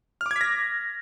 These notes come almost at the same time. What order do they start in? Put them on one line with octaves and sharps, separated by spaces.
F6 D6 G#6 B6 A#6